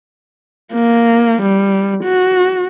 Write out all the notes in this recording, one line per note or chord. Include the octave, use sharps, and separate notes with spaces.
A#3
G3
F#4